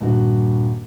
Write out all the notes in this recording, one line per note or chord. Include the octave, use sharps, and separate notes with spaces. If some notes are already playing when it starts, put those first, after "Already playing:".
D#1 G2 F#4